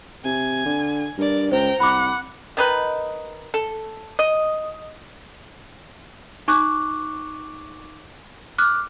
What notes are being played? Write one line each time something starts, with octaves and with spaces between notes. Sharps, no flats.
C3 G#5
D3
G2 A#4 D5
C#2 C5 G5 A#5
C2 F#5 B5 D6
D#3 D#4 B4
A4
D#5
D#4 C#6 D6 F#6
D6 F6 F#6